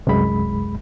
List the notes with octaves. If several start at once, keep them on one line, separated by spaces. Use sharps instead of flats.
C2 F#2 G#3 B5